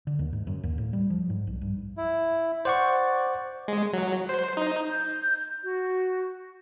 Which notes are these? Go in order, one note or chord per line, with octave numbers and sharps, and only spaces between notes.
D3
D#2
G#2
F#2
D#2
A2
G3
F3
G#2
B1
G2
E4
C5 D5 F#5 C#6
G#3
F#3
C5
D#4
G6
F#4